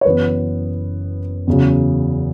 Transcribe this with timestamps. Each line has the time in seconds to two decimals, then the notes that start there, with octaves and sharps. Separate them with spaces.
0.01 C#5
0.05 F#1 F#2 E3 B3 B4
1.47 E2 C#3 F#3